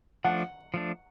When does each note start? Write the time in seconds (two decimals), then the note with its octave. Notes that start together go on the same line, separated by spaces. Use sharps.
0.24 F3 A3 D4 F#5
0.74 F3 A3 D4